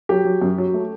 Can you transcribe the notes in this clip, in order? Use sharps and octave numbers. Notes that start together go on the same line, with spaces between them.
F#3 G4
F#3
F#2
F#3
A3